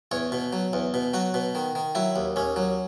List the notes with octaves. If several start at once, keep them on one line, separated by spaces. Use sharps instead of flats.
E2 C#5
B2
F#3
E2
B2
F#3 F#4
B2
D#3
D#3
F#3 E4
D#2
D#2 C#4
F#3